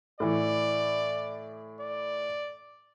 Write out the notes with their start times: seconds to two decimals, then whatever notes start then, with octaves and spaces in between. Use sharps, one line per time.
0.20 A2 E3 D5
1.81 D5